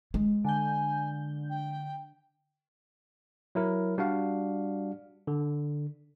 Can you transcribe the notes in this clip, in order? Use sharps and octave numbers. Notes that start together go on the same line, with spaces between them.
G#3
D3 G#5 G6
G5
F#3 E4 A#4
G3 D4 F#4 F5
D3